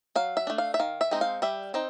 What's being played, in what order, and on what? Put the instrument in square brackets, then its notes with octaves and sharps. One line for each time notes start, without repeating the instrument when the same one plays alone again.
[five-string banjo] F#3 F5
E5
A3 D4
F5
E5
D#3 F5
E5
G#3 C4 D#4
F5
G3 E5
C4 D#4